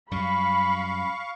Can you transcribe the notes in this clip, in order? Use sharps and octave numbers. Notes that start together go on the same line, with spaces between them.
F#2 G3 F5 B5 C#6